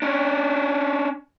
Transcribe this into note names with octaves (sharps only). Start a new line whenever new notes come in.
C#4 D4